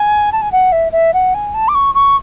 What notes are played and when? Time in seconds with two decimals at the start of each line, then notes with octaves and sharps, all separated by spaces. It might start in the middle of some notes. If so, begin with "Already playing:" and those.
Already playing: G#5
0.32 A5
0.42 G#5
0.52 F#5
0.72 E5
0.92 E5
1.13 F#5
1.34 G#5
1.54 A5
1.68 D6
1.75 C#6
1.94 C#6